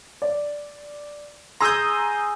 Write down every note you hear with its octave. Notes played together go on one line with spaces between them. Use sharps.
D5
G#4 A#5 C6 D#6 E6 G6